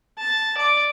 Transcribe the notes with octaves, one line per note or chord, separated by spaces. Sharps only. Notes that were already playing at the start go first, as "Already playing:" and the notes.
A5
D5